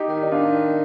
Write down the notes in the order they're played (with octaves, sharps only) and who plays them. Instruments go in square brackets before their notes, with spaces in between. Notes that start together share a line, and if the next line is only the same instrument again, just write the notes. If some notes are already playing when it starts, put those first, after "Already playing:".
Already playing: [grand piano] D#4 G4
[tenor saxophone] D#3
[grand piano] D#4
D4 F4